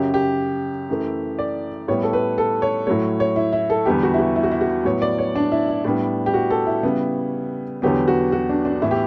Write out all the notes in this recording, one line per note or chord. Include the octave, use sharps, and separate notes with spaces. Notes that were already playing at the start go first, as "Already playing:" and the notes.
Already playing: F#2 C#3 F#3 G4
G4
F#2 E3 A3
D5
A2 G3 B3 C#5
A4
B4
A4
C#5
A2 F#3 A3 C#5
C#5
E4
E4
A4
E2 D3 G3 B3 G4
F#4
E4
F#4
E4
F#4
E4
F#4
A2 F#3 B3 C#5
D5
C#5
D4
E4
E4
A2 G3 B3 D4
G4
F#4
A4
E4
C#3 G3 B3
E2 D3 F#3 B3 G4
F#4
F#4
D4
D4
A2 E3 B3 E4
G4